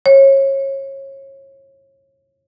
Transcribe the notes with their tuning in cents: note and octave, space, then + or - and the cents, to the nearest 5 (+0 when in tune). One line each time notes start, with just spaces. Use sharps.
C#5 -30